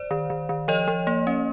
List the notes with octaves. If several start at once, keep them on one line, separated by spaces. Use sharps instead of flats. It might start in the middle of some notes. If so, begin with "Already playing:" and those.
Already playing: C5 D5
D#3
D#3
D#3
F3 C#5 D#5
F3
A#3
C#4